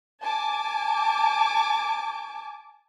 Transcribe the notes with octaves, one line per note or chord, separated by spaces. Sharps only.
G#5 A5 D6